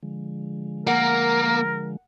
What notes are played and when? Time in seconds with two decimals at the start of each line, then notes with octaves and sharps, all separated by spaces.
0.03 D3 F3 G#3
0.87 A#3 A#4 F#5